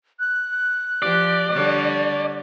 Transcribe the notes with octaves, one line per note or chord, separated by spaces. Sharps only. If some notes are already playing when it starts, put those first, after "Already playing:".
F#6
F3 G4 D5
D3 G3 C#5